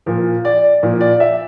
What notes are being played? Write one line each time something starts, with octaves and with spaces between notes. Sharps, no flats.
A#2 F3
D5
A#2 F3
D5
E5